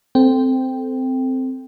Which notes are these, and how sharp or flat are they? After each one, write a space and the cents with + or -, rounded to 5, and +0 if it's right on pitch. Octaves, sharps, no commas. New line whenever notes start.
C4 -10 A4 +0 G5 +0